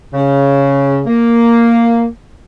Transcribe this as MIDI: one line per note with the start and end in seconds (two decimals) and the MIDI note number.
0.14 1.00 49
1.07 2.05 58